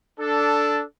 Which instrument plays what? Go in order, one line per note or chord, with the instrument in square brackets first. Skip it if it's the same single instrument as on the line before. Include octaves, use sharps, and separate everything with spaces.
[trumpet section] D4 A4